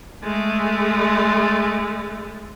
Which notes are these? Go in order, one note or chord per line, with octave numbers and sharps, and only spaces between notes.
G#3 A3